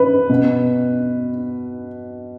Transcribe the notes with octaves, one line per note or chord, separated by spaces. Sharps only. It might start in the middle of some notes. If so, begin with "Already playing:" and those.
Already playing: B4
B2